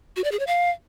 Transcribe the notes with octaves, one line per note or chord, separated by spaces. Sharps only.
F#4
D5
G#4
C#5
F5